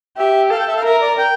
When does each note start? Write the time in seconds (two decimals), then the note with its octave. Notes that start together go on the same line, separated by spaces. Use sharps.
0.17 G4 E5
0.50 A4 F5
0.59 G5
0.68 E5
0.76 F5
0.84 A#4 E5
1.02 D5
1.18 G5